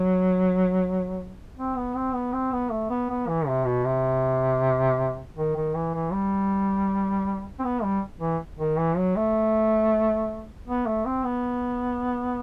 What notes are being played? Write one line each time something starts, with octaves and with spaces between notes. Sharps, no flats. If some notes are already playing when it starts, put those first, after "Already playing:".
Already playing: F#3
C4
B3
C4
B3
C4
B3
A3
B3
B3
E3
C3
B2
C3
D#3
D#3
E3
E3
G3
C4
B3
G3
E3
D#3
E3
F#3
A3
B3
A3
C4
B3